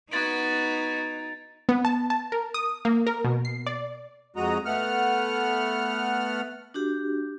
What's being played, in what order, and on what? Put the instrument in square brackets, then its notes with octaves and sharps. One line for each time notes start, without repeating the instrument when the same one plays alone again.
[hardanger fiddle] B3 F#4 [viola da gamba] D#4 [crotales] G#6 A6 D7
[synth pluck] B3
A5
A5
A#4
D#6
A#3
A#4
B2
C7
D5
[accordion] F2 G#3 F#4 D#5 A#5
A3 B3 F#5 F6
[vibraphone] D4 F#4 G4